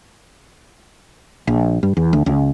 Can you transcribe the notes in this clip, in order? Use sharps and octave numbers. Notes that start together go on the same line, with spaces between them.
A#1
G2
E2
D2
C#2